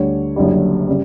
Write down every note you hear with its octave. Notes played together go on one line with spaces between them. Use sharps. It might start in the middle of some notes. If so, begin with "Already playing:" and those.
Already playing: D2 D3 G3 C#5
F#1 F#2 D3 G3
C#3 G3